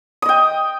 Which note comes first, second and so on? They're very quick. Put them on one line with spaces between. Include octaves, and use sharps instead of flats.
D#6 D#5 G5